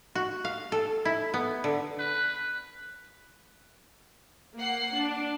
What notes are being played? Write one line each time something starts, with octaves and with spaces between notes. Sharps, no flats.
F#4
F5
A4
E4
B3
D3
B4
A#3 F#5 C7
D4